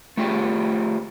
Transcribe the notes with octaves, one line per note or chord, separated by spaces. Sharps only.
A3 F4 G4 G#4